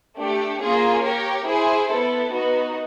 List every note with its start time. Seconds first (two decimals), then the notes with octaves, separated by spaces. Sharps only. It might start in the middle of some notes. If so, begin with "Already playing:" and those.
0.17 A3 D4 G4
0.60 A#3 C#4 F4 G#4
1.04 G4 A#4 C#5
1.47 E4 G#4 C5
1.89 B3 E4 A4
2.33 B3 D#4 F#4